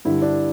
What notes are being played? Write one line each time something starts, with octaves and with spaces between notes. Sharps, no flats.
G2 D3 G3 E4
D4